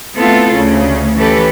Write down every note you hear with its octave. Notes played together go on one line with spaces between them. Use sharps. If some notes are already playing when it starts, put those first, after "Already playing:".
A3 B3 C4 E4 F4 A4
D2 C#3 C#4
E3 C#4 G4 A4 B4